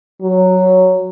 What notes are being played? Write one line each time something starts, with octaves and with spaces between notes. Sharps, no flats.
F#3